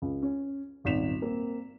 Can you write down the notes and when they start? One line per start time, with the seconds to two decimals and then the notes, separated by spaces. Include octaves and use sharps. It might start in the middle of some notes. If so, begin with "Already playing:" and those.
0.02 C#2
0.22 C#4
0.84 D#1 G#1 D#4 B6 E7 F7
1.22 A#3 C4